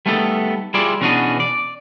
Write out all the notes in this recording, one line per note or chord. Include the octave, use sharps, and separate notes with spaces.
G3 A3 B3 D#4 F#4 A4
G3 E4 F4 G#4 D5
B2 E3 C#4 D4 F#4 G#4
D5